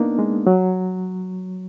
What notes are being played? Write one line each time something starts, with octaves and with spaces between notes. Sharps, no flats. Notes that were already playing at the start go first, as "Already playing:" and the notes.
Already playing: A#3 B3 D4 D#4
G#3
F#3